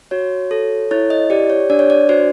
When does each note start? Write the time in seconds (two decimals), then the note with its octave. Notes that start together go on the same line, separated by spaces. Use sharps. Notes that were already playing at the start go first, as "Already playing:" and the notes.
0.11 F#4 C#5
0.51 A4
0.91 E4 C#5
1.10 D#5
1.30 G4 D5
1.50 C#5
1.70 D4 D5
1.79 C#5
1.90 D5
2.09 F#4 C5